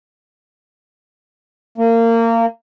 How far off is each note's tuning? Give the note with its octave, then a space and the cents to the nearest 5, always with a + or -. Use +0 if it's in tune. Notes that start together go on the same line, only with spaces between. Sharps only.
A#3 -25